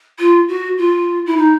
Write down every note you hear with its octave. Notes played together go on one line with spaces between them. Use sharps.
F4
F#4
F4
E4
D#4